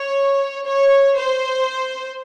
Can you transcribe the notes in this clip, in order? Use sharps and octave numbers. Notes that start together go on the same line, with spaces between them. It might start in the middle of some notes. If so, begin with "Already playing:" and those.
Already playing: C#5
C#5
C5